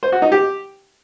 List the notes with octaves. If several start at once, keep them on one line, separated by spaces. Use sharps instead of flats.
C5
F#4
D#4
G4